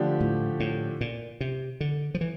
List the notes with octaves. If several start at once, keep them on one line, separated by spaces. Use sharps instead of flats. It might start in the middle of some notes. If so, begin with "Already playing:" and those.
Already playing: D3 F3 A3 D4 G4
A2
A2
A#2
C3
D3
F3
E3